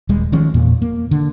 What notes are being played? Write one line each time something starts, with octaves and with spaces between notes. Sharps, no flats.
D#1 G3 G#3
D#3 F3 G#3 C#4
E2 A#2
A#3
D3